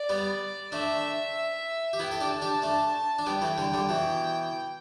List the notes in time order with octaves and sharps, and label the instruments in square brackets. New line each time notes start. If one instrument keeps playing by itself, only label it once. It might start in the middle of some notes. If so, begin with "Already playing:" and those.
Already playing: [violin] D5
[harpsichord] G3 B3
[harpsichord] A3 D4 [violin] E5
[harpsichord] G4
[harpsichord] B3 E4 [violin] G5
[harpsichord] A4
D4 G4
[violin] A5
[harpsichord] D4 G4
A3 D4
D4
[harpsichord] G3 B3 [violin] G5
[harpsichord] E3 A3
D3 G3
D3 G3
B2 E3